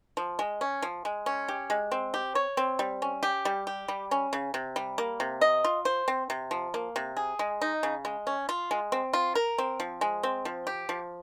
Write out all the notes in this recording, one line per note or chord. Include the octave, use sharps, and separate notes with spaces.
F3
G#3
C#4
F3
G#3
C#4
G4
G#3
C4
G4
C#5
C4
G3
C#4
G4
G3
G4
G3
C#4
C#3
C3
G3
A#3
C3
D#5
F4
C5
C4
C3
F3
A#3
C3
G#4
G#3
D#4
C#3
G#3
C#4
F4
G#3
C4
F4
A#4
C4
F3
G#3
C4
F3
G4
F3